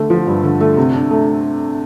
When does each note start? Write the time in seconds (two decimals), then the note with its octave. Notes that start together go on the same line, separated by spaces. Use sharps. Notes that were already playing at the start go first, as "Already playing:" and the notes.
Already playing: D3 A3
0.10 F3
0.27 G2
0.43 D3
0.60 A3
0.77 C3
0.94 D4
1.11 A3